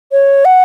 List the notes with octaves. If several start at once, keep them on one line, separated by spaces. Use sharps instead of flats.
C#5
F#5